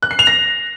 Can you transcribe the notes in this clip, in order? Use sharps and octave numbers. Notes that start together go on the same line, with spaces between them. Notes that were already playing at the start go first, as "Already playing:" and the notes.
F#6
C7
F7
A#6